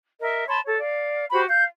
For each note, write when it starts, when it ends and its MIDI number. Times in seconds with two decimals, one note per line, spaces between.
0.20 0.43 70
0.20 0.43 75
0.20 0.43 76
0.47 0.58 73
0.47 0.58 81
0.47 0.58 83
0.47 0.58 84
0.64 0.75 69
0.64 0.75 73
0.79 1.25 74
0.79 1.25 77
1.31 1.43 66
1.31 1.43 67
1.31 1.43 72
1.31 1.43 83
1.48 1.64 77
1.48 1.64 91